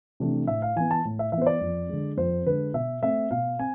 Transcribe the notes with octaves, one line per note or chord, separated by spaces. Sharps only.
C3 E3 A3 D4
A2 E5
F5
E3 B3 G#5
A5
A2
E5
E3 E5
B3 C5
D5
F2
D3 G#3
F2 C5
D3 G#3 B4
B2 E5
A3 C4 E5
B2 F5
C4 G#5